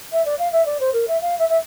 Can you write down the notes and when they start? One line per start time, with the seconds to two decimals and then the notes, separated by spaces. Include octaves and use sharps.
0.12 E5
0.25 D5
0.38 F5
0.52 E5
0.65 D5
0.80 C5
0.93 A#4
1.07 E5
1.21 F5
1.38 E5
1.49 E5